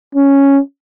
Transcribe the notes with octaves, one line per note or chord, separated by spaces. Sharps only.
C#4